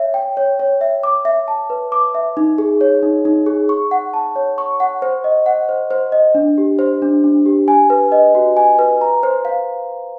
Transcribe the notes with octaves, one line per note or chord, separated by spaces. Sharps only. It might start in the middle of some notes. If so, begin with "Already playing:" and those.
Already playing: C#5 E5
G5
C#5
C#5
E5
D6
E5
A5
B4
D6
E5
D#4
G#4
C#5
D#4
D#4
G#4
C#6
F#5
A5
C#5
C#6
F#5
C5
D#5
F#5
C5
C5
D#5
D4
G4
C5
D4
D4
G4
G#5
B4
D#5
F#4
G#5
B4
A#5
C5
F5